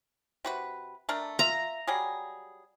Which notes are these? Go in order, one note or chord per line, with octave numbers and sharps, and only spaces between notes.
C3 F#4 B4
A3 D4 A#4
F4 E5 A#5
F#3 G3 G#4